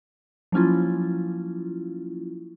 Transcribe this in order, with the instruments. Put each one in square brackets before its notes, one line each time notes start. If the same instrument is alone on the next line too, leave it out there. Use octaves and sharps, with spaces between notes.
[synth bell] F3 F#3 A#3 C#4 E4 F4